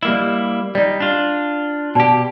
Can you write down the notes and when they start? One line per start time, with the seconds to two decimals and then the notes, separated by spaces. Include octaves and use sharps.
0.03 G3 A#3 E4 D#5 E5
0.75 G3 D#4 D5
1.00 D4 F4
1.95 B2 G4 D5 A5